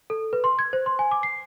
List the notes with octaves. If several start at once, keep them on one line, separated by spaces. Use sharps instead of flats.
A4
B4
C6
G#6
C5
C6
G#5
D6
C7